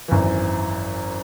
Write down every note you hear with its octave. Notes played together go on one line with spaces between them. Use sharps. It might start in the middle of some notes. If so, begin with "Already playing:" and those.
G#1 F#2 E3